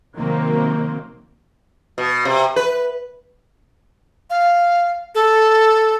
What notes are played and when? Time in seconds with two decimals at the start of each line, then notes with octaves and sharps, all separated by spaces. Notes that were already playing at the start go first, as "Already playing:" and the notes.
0.17 C3 D#3 F#3 A#3 C4
1.98 B2
2.25 C3
2.56 B4
4.30 F5
5.15 A4